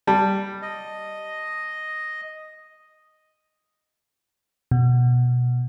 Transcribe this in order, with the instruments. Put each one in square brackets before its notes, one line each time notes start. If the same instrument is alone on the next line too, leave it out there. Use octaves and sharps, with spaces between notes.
[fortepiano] G3 [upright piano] A5
[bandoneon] D#5
[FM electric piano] B2